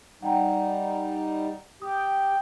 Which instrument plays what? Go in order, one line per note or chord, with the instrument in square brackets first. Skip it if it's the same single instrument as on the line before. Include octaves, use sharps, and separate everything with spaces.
[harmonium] G3 D#4 [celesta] F#5 G5 A#5
[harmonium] G4 [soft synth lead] G5 [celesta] D#6